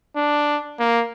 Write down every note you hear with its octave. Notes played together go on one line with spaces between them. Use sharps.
D4
A#3